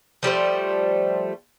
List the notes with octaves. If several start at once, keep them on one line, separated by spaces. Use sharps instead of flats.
F3 G3 A3 C5